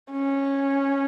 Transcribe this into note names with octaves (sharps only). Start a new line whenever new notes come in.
C#4